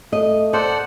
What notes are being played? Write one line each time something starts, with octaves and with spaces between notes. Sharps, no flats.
A3 D#5
A4 C5 D5 F#5